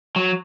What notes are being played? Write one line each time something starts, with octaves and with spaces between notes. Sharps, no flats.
F#3